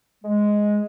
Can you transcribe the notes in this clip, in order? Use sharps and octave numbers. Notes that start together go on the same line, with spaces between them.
G#3